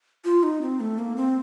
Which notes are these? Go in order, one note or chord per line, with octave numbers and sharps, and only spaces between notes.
F4
D#4
C4
A3
A#3
C4